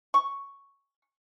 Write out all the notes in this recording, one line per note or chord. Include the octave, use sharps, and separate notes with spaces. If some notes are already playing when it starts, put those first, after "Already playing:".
C#6